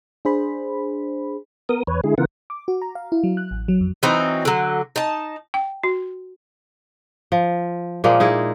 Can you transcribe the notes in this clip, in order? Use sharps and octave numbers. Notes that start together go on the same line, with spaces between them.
D4 G#4 C5 B5
B3 A#4 D#6
E2 B4 C#5
D3 G#3 E4 G#4
C#3 E3 B3 F4 A#4 F#5
D6
F#4
A#5
F5
E4
F#3
F#6
A1
F#3
F2
E3 F#3 C4 D#4
D3 F#3
D#4 A5
G5
F#4
F3
A#2 F3 G#3 A#3
D#4 E4 G#4